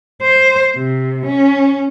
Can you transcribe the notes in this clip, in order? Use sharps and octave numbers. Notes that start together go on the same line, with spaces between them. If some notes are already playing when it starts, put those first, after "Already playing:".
C5
C3
C#4